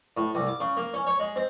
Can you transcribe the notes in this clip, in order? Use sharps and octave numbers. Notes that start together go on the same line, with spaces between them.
A2
C2
D6
C#3
A#3
C#4
C#5
G#3
C4